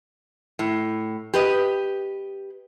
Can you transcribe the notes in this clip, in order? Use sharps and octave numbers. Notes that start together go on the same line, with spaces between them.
A2
G4 B4 D#5